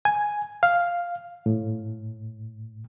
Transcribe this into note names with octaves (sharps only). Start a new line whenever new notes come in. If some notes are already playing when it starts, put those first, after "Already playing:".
G#5
F5
A2